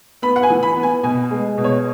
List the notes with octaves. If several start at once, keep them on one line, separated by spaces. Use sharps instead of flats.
B3 B5
F#5
G#5
E3
B5
B3
G#5
B2 G#5
G#3
B2
C#5